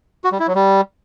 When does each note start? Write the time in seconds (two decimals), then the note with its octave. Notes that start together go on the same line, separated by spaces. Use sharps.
0.24 F#4
0.32 G3
0.40 E4
0.47 F#3
0.55 G3